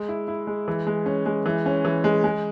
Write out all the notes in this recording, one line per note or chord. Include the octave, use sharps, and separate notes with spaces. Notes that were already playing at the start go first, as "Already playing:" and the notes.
Already playing: G#3
E4
E4
G#3
E3
G#3
C#4
G#3
E3
C#4
E3
G#3
G#3